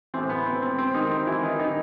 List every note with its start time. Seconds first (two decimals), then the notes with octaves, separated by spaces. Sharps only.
0.14 E3 C4
0.17 A2
0.30 B3
0.46 C4
0.62 C4
0.78 C4
0.94 D#3 D#4
1.11 C4
1.27 E3 E4
1.43 D#3 D#4
1.59 D#3 D#4